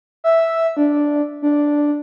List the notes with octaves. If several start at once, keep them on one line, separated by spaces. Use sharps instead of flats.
E5
D4
D4